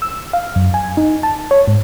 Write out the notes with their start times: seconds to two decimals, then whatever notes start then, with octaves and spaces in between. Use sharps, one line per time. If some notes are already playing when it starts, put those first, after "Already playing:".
0.02 E6
0.33 F5
0.56 F#2
0.74 G#5
0.97 D#4
1.23 A5
1.51 C#5
1.68 G#2